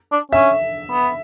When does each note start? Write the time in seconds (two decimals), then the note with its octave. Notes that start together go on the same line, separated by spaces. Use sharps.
0.12 D4
0.32 C#4 E5
0.91 B3